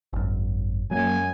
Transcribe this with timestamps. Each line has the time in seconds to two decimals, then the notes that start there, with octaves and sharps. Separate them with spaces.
0.13 G#1 F#2
0.91 F#2 F#3 G#3 A#3 G#5